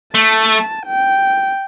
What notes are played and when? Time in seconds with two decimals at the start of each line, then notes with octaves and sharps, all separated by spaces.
0.15 A3 A5
0.87 G5